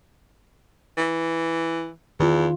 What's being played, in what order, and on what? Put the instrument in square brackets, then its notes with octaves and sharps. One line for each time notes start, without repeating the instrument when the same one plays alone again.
[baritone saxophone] E3
[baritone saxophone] E2 [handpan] D#3 F4